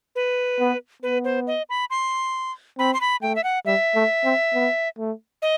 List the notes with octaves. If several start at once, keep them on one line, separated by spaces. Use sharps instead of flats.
B4
B3
B3 B4
C5
D#5
B5
C6
C4 B5
C6
B5
A3 G5
E5
F#5
G3 E5
A3
C4
B3
A3
D#5